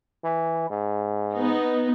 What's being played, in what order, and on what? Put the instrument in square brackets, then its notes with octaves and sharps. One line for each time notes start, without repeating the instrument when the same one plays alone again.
[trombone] E3
G#2
[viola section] B3 D#4